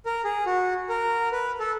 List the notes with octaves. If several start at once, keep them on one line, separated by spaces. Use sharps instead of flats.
A#4
G#4
F#4
A#4
B4
A4